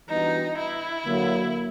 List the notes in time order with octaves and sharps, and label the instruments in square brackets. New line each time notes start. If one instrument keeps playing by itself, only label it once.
[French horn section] E3 G3 B3 D4 F#4 [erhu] D#4
[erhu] E4
[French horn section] D3 F#3 A#3